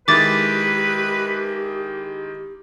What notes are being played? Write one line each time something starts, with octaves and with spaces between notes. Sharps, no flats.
D#3 G#3 E4 G4 B4 D6 A6